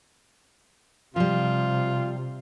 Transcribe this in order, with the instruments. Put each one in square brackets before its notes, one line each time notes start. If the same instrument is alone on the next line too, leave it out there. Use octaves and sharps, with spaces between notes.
[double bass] C3 [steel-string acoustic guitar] F3 G3 [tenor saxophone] F4